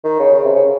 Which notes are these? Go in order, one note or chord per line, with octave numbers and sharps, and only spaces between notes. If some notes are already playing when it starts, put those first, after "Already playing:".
D#3
C#3
C#3
C3
C#3